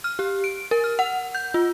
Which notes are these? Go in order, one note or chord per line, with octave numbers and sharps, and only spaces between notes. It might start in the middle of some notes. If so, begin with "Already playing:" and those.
F6
G4
D7
A#4
F6
F#5
G6
F4